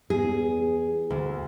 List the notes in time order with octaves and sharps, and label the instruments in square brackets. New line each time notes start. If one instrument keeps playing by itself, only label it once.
[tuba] E2 [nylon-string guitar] G#4
[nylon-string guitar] D2